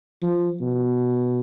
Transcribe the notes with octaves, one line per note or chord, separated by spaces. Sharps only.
F3
B2